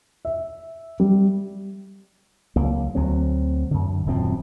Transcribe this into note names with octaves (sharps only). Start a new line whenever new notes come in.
E5
G3
C#2 F#3 A#3
D2 F#3 C4
F#2 D3
D#1 F#2 A#2 C4